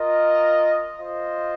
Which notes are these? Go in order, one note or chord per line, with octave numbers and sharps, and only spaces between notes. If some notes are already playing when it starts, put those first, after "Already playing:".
Already playing: F4 A#4 D#5
F4 C5 D#5